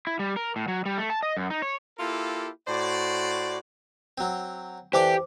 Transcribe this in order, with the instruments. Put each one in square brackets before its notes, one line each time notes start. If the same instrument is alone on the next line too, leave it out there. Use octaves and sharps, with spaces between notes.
[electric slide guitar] E4
G3
A#4
A2
F#3
G3
A3
A5
D#5
F#2
D#4
C#5
[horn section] A#3 E4 F4 G4 A4
A2 F#4 C5 D5
[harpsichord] F#3 C4
[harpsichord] E3 A4 D5 [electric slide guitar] G4 [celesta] C5 D6